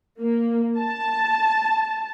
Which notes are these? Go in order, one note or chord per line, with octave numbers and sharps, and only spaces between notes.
A#3
A5